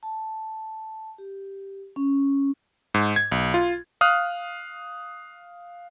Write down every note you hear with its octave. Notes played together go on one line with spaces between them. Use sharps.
A5
G4
C#4
G#2
G#6
B1
F4
F5 D#6 F6 F#6